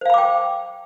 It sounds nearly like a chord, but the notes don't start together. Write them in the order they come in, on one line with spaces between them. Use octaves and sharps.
C5 F5 B5 D6 G5